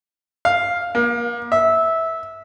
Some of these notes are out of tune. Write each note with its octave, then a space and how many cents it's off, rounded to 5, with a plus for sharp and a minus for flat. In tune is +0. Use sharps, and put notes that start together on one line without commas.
F5 +5
A#3 +35
E5 -15